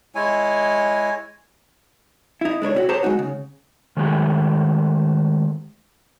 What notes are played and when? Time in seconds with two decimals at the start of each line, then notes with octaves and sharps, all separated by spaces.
0.15 G#3 E4 C#5 G#5
2.41 D#4 E4
2.62 G#3 D4 A#4 C#5
2.75 C3 E4 F#4
2.89 G4 G#4 C5 C#5 A5 A#5
3.03 G#3 C4 D#4 F#4
3.19 C#3
3.97 D#3 G#3 A3 G4 G#4